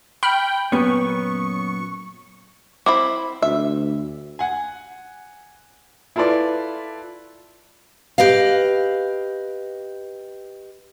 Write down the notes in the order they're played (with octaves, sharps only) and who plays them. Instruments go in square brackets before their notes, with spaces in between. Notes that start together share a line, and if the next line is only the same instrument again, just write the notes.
[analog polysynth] G5 [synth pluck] B5 F6
[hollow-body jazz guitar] F#2 A#2 C#4 [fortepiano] B3 [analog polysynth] C#6
[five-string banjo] C4 E4 B5 [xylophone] D6
[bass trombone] D2 [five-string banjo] E5
[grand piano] F#5 G#5
E4 F4 A4 B4 D5
[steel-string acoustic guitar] G4 B4 D#5 F5